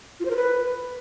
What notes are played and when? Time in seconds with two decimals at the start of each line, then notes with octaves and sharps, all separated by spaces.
0.20 F4
0.25 C5
0.31 A#4
0.36 B4